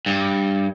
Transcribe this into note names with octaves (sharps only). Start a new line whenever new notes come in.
G2